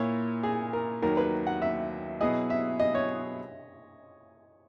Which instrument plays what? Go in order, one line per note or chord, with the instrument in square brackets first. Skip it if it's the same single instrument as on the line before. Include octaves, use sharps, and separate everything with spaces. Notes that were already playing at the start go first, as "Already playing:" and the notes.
Already playing: [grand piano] A#2 A#3 E4 [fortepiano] C#5
[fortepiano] G#4
A#4
[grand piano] D#2 D#3 F#3 [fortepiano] A#4
[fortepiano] B4
F#5
E5
[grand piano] B2 F#3 B3 E4 G#4 [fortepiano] D#5
[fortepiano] E5
D#5
C#5